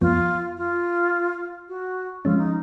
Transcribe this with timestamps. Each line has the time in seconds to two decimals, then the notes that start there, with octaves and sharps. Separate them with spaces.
0.01 F2 F3 B3 F4
0.57 F4
1.69 F#4
2.25 F3 G#3 C#4 F4
2.38 D#4